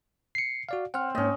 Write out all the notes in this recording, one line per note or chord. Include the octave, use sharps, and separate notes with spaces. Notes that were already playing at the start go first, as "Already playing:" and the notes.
C7 C#7
F#4 D5 F5
C4 F#5 F6
G#2 A#3 C#4 D#5